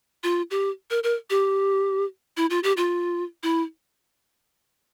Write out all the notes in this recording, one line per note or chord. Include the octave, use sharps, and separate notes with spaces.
F4
G4
A#4
A#4
G4
E4
F4
G4
F4
E4